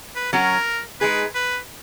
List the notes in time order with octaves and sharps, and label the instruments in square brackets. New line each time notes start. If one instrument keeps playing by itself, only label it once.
[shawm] B4
[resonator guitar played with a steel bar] F#3 C#4 F#4 [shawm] A#4
[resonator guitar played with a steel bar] G#3 D#4 G#4 [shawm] B4
[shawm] B4